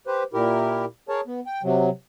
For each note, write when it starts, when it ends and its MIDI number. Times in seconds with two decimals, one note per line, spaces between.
0.07 0.23 67
0.07 0.23 71
0.07 0.23 72
0.34 0.85 46
0.34 0.85 64
0.34 0.85 67
0.34 0.85 70
1.09 1.21 68
1.09 1.21 70
1.09 1.21 73
1.09 1.21 81
1.27 1.40 59
1.46 1.62 79
1.63 1.89 48
1.63 1.89 54